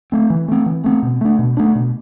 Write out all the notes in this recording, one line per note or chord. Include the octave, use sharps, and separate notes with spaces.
A3 C4
E3
A3 C4
E3
A3 C4
B2
A3 D4
B2
A3 D4
B2